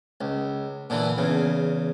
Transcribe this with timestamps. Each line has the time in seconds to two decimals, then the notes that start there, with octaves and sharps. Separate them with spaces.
0.21 C#2
0.90 A#2 D3 E3
1.18 E2 C#3